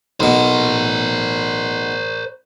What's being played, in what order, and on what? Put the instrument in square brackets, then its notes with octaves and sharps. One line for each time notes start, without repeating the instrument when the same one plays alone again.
[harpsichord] B1 B2 [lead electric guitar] A#4 C5